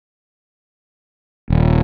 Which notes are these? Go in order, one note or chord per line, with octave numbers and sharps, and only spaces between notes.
D#1